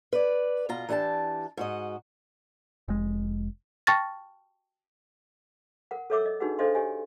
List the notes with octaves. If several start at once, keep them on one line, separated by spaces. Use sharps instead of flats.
B4 D5
B2 F4 A#5
E3 D4 G4 F#5 A5
G#2 F#4 D#5
F1 G#3
G5 A5 C#6 F6 A6 A#6
A#4 F#5
A4 A#4 C#5 E5 D6 E6
D#5
D4 D#4 F#4 G#4 B4 F#5
D4 A4 C5 D#5 F5 C6
G4 C#5 D#5 G#5